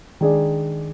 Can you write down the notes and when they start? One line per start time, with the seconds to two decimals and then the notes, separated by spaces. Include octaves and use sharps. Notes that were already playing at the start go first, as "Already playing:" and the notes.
0.21 D#3 G#3 D4 G#4 D5